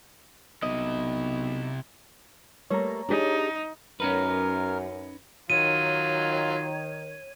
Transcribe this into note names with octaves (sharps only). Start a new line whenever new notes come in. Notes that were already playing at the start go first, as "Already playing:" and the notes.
B1 C3 E4 D#5
G3 A3 A#3 C#5 A#5
D4 D#4 G4 G#4
F#2 C#4 D#4 A#4 B4
D#3 F#3 F4 C#5 D#7